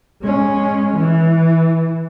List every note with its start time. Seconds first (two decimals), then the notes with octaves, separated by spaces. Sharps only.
0.22 G#3 C#4
0.96 E3